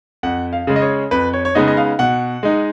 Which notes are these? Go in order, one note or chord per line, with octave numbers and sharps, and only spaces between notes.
F2 F#5
F5
C#3 G#3
D#5
C#5
F2 B4
C#5
C#5
C#3 G#3 B3 D#4 D#5
D#5
F5
B2 F#5
G#3 D#4